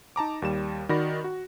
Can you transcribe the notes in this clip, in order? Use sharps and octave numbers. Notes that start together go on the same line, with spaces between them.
D#4 A5 A#5 D6
D#2 G3 E7
D#3 F#4 D5 B5 A#6
F#4